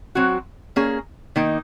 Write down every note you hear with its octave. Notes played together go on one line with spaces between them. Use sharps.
F#3 C4 F#4
A#3 C#4 G#4
D#3 A#3 D#4